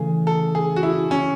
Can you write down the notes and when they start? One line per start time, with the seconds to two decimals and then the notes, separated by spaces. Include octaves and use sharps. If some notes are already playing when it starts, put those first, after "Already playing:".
Already playing: C#3 E3 A3 G#4
0.27 A4
0.55 G#4
0.76 F#4
0.83 E4
1.11 C#4